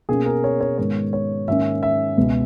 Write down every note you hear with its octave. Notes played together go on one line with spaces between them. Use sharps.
B2 A#3 C#4 G#4
A#4
C#5
C#5
G#2 D#3 G#3 B3 C#5
C#5
G#2 D#3 A#3 C#4 E5
E5
C#2 B2 G#3 B3